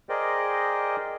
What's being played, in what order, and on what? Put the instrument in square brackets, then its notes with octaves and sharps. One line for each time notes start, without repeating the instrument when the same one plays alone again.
[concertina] G#4 A#4 C5 D5 D#5 G5